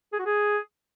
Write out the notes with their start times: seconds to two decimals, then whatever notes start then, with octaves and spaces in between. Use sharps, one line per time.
0.13 G#4
0.19 F#4
0.26 G#4